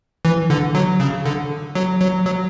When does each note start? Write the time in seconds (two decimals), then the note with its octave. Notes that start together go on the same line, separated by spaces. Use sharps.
0.25 E3
0.50 D3
0.75 F#3
1.00 C#3
1.26 D3
1.75 F#3
2.01 F#3
2.26 F#3